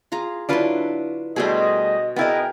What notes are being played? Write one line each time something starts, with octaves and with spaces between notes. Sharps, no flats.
F4 G#4 A#5
D3 F#3 D4 E4 F4 B4
B2 G3 A3 G#4 C5 D#5
B3 E4 G#4 A#4 D5 D#5 G5